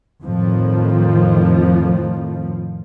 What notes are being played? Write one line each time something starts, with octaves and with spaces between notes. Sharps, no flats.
F2 A2 D#3 F3